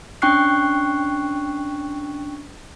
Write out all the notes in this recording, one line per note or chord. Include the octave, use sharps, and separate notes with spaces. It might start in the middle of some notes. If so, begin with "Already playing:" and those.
C#4 D4 G5 C#6 F#6 C7